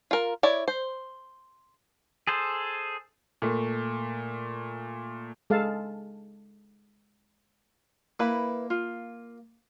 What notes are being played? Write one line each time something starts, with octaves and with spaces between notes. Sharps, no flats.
F4 A#4
E4 C#5 D5
C5
G#4 A4 C5
A#2 A3
G#3 A4 F5 A5
A#3 E4 B4 B5
F4